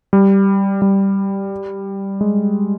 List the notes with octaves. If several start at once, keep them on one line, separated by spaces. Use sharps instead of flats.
G3
G3
G#3